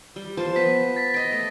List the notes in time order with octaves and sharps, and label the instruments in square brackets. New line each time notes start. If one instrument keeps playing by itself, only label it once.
[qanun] G3
F3 C5 A5
[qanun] B3 [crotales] B6
[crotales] A6 B6
[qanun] D#5 G5 [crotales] A6 A#6
[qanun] A3